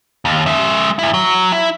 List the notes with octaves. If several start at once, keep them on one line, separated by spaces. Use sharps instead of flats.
D#2
G#3 E5
D2 E4
F#3
E4